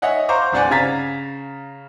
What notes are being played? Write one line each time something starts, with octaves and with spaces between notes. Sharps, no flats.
C#5 D#5 E5 F#5 G#5
C5 F5 A#5 C#6 D6
G1 C2 C4 D5 F#5 G#5
C#3 F5 A#5 G#6 A6 B6